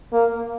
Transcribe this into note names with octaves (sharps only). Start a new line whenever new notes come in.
A#3